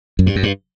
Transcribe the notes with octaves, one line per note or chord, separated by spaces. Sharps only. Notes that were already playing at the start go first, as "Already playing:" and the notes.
F#2
G2
F#2
G2